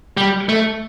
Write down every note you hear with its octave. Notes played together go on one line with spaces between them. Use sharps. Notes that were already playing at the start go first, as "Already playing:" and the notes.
G3
A3